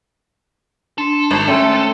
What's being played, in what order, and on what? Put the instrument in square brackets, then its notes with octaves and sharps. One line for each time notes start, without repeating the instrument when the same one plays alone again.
[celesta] D4 C6 C7 [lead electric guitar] A4
[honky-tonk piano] G#1 [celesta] A6 C7
[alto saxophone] A3 [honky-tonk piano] C#4 [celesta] G5 C6 E6